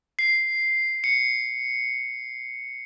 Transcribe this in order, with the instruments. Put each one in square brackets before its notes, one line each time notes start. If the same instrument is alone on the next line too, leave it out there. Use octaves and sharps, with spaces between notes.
[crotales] C7
C#7